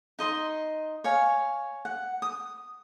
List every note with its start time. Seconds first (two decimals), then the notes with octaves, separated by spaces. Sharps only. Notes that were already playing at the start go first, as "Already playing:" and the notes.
0.19 D#4 D#5 C6
1.04 C#5 F5 G#5
1.85 F#5
2.22 D#6